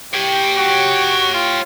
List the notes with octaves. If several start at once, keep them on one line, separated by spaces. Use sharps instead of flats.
G4 C#5 G5
F#4
F4